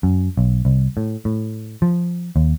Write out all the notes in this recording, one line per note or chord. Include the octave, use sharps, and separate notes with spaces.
F#2
B1
C2
A2
A2
F3
D#2